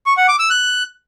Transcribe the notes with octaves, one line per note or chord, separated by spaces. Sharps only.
C#6
F#5
D6
E6
F#6